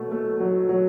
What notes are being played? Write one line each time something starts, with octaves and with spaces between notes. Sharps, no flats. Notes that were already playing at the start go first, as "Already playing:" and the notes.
Already playing: B2 F#3 A3
A3
F#3
F#3